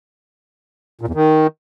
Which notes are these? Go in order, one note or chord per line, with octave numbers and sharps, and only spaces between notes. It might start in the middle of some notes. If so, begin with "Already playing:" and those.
A#2
E2
D#3